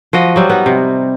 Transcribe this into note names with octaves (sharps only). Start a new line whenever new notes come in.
F3 F#4 D#5
F#3 G3
B3 D#4
C3